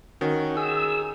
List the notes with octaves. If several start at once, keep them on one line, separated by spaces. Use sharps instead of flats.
D#3 C#4 F#4
G#4 E6